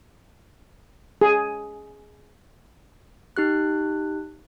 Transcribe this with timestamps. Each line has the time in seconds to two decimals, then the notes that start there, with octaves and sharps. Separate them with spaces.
1.21 G#4
3.37 D#4 G4 F#6